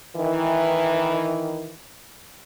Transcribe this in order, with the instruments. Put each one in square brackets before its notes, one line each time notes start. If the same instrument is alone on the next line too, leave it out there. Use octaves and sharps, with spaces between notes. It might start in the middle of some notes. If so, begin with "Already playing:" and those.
[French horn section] D#3 E3